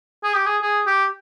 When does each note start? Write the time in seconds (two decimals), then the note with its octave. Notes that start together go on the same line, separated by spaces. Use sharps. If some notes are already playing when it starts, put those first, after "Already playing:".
0.24 G#4
0.35 G4
0.46 G#4
0.62 G#4
0.87 G4